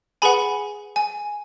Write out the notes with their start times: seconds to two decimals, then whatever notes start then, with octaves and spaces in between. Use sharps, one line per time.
0.22 G#4 B4 F#5 G#5 B5
0.96 G#5